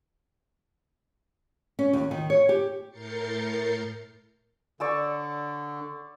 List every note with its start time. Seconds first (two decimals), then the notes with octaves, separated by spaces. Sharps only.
1.79 C#4
1.93 D#2
2.11 D#3
2.30 C#5
2.49 G4
2.90 A2 A#4 G6 A6 C7 C#7
4.80 D3 D5 C#6 E6